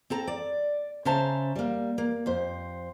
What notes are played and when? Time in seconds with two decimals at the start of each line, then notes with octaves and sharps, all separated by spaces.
0.10 C4 A4 A#5
0.27 D5
1.05 C#3 C#4 C5 E5 A5 A#5
1.56 G3 A#3
1.98 A#3
2.26 F2 C5